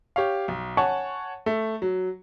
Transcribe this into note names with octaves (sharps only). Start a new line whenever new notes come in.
G4 C#5 F5
B1
C#5 F#5 G#5 A5 C#6
A3
F#3